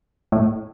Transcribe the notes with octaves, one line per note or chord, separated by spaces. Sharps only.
A2